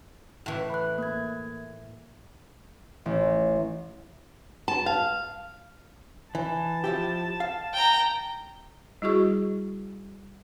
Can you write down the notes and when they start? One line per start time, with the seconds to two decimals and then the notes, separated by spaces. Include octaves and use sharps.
0.46 A2 E3
0.70 B5 F#6
0.98 A#3 G#6
3.06 A1
4.68 A5
4.86 F5
6.35 E3 A5
6.84 F3 E4 G4
7.40 F5
7.74 G5 A#5
9.02 G3 E4 F#4 G#4 C#6